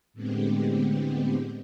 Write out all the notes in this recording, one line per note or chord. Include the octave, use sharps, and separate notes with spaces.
A2 D3 G#3 B3 C4 G4